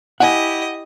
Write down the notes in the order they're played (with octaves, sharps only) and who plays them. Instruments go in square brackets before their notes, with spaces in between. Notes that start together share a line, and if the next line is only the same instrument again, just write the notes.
[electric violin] E4 G4 [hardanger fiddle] D#5 [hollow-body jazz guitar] F#5 G#5